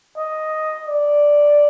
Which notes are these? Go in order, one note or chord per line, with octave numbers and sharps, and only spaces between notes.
D#5
D5